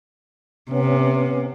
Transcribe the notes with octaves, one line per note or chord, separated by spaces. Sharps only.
C3 B3 C#4